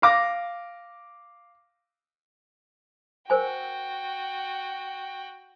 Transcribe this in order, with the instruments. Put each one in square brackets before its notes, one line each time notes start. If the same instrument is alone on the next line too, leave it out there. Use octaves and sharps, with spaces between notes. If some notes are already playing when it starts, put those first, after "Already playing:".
[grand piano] F5 D6 A#6
[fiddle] F#4 G5 [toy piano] A#4 C5 G#5